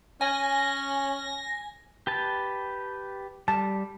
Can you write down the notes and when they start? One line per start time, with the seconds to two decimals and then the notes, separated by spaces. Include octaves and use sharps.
0.21 C#4 G#5 A#6
2.07 G4 B4 A5
3.48 G3 A5